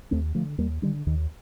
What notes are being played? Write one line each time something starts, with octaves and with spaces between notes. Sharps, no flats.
D#2 A3 C4
D3 F3 A3
D#2 G3 A#3
D3 D#3 G3
D#2 D#3